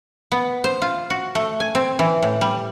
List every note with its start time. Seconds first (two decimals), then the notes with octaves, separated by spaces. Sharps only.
0.32 B3
0.64 C5
0.82 F4
1.10 F#4
1.35 A3
1.60 G#5
1.75 C4
1.99 E3
2.22 A2
2.41 G3